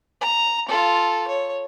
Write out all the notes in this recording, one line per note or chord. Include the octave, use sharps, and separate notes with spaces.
A#5
F4 A4
C#5